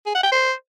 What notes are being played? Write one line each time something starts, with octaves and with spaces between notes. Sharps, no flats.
G#4
F#5
G5
C5